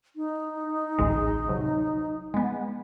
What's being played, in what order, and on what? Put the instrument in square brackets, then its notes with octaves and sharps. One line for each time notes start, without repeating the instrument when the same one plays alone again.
[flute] D#4
[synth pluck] A1 D2 G#3
C3 F#3
G#3 B3